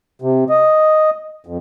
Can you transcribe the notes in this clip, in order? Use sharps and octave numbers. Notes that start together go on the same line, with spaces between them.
C3
D#5
F2